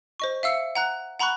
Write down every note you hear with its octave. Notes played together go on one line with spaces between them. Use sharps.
C5 D#5 C#6
E5 F5 E6 C7 C#7
F#5 A#5 F#6
F#5 A#5 B5 C#6 F#6